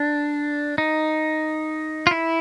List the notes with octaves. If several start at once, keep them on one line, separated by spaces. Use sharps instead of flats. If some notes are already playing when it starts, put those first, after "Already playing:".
Already playing: D4
D#4
F4
E4